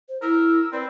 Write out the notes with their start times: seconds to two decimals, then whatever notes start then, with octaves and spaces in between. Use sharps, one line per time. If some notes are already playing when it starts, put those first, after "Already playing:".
0.09 C5
0.22 E4 A#4 E6
0.73 C4 B4 D5